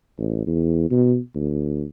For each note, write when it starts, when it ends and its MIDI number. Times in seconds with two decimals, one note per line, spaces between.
0.18 0.46 33
0.47 0.90 40
0.91 1.18 47
1.35 1.85 38